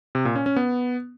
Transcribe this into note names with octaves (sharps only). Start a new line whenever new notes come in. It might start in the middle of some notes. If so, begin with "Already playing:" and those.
C3
A#2
C#4
C#4
B3